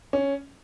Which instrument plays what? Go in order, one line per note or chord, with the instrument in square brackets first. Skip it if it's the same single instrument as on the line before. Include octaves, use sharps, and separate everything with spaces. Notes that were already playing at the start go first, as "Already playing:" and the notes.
[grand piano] C#4